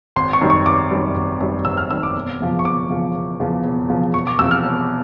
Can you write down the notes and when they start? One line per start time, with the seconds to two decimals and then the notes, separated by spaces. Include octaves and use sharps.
0.16 G#1 C6
0.33 C#6
0.41 F#2 D#3 G3
0.50 C#6
0.66 G#1 D6
0.91 F#2 D#3 G3
1.16 G#1
1.40 F#2 D#3 G3
1.65 G#1 E6
1.77 F6
1.90 F#2 D#3 G3 E6
2.03 D6
2.16 E1
2.40 E2 C#3 F3
2.59 C#6
2.65 E1 D6
2.89 E2 C#3 F3
3.15 E1
3.40 E2 C#3 F3
3.64 E1
3.88 E2 C#3 F3
4.14 E1 C#6
4.27 D6
4.39 E2 C3 F3 E6
4.51 F6
4.63 E1